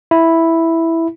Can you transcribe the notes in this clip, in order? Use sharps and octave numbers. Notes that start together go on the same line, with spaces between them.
E4